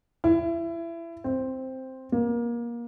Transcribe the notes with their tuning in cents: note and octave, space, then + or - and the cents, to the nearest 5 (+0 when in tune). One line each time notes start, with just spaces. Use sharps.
E4 +25
C4 +0
A#3 +25